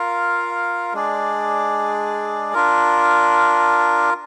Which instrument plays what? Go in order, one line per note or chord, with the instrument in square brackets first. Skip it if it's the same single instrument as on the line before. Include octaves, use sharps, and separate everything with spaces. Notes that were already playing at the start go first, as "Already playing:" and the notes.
Already playing: [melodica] F4 A#4 F5
G#3 D4 G#4 D5
D4 F4 A#4